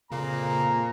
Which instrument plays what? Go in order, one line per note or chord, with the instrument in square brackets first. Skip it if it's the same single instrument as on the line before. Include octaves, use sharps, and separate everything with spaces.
[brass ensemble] F2 A#5 [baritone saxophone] A#2 [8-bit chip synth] C#3 A#3